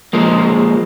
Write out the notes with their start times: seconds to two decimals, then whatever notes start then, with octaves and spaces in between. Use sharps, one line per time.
0.13 F3 G#3 A#3